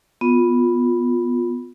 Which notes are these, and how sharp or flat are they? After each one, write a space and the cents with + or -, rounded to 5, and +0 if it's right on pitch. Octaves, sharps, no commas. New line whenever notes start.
B3 +0 F4 +15